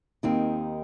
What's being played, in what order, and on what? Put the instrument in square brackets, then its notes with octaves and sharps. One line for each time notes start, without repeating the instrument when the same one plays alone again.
[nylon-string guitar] D#2 D#3 C4 [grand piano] A#3 D#4